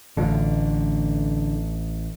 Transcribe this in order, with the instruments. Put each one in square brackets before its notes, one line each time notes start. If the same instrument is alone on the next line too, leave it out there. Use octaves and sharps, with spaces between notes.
[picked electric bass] A1 [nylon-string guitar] D3 A3 F4